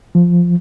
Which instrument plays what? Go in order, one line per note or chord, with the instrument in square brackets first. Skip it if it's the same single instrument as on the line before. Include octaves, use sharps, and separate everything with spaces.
[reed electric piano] F3